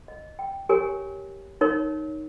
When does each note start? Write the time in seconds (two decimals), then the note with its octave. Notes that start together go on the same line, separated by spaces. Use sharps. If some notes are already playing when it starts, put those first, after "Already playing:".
0.08 D#5
0.39 G5
0.69 G4 A#4 C#5 G#5
1.61 D#4 A#4 C#5